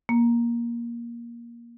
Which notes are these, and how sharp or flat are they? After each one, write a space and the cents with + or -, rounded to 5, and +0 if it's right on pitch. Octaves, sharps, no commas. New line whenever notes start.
A#3 +15